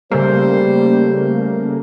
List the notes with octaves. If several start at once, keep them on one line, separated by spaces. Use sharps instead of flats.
C#3 G3 A3 A#3 C5